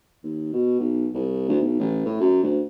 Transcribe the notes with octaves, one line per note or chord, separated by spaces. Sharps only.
D#2
B2
B1
C2
D2
B1
A1
A2
F#2
D2